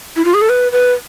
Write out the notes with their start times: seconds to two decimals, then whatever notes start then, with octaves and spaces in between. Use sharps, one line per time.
0.16 E4
0.25 F4
0.34 G#4
0.42 A4
0.49 B4
0.72 B4